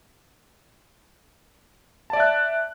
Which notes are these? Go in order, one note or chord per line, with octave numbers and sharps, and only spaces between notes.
D5 E5 A5 F#6